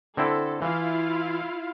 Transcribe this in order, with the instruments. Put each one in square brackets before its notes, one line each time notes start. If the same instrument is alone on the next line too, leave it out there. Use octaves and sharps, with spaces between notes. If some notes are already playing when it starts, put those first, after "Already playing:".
[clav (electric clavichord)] D3 C4 E4 [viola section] A4
[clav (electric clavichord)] E3 [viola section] E4 F4 F5